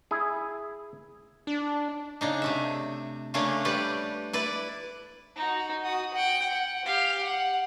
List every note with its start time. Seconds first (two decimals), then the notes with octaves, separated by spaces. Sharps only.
0.11 E4 G#4
1.47 D4
2.21 C#3 D4 D#4
2.42 C3 A3 E5
3.34 C#3 A3 A#3 C#4 D4
3.65 G3 G4 B4 D5
4.33 E4 B4 D5
5.36 D#4 F#4
5.84 F#4 D#6
6.14 F#5 G5
6.52 F#5
6.85 G4 F5
7.22 F#5